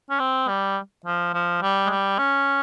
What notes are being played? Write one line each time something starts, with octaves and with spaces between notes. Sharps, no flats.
C#4
C4
G3
F3
F3
G3
G#3
G3
C#4